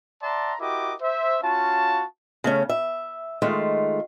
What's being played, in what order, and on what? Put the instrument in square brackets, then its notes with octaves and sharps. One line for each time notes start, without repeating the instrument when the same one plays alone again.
[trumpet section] D5 E5 F#5 A5 A#5 C6
E4 F#4 G4 A#4 D#5 D6
C5 E5
C#4 F4 F#4 F5 A5
[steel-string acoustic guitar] C#3 A3 C#4
E5
D#3 G#3 A3 F4